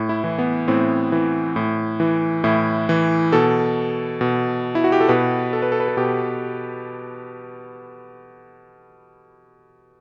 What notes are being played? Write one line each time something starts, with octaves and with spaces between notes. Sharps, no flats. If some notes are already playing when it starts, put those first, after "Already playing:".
Already playing: A2
E4
E3
B3
A2 C4
E3
A2
E3
A2 E4
E3
B2 A4
B2
E4
F#4
G4
A4
B2 B4
A4
B4
A4
B4
A4
B2 G4